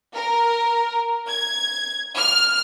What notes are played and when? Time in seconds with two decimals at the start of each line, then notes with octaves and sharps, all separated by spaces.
0.14 A#4
1.28 G#6
2.17 F6